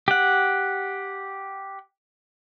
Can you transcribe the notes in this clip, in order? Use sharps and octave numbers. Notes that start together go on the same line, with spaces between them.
G4 F#5